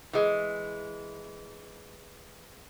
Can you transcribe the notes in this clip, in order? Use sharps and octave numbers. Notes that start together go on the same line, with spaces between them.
E3 G#3